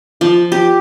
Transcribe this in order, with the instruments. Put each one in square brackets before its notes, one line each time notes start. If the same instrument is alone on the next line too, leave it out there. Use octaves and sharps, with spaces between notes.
[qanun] F3
G4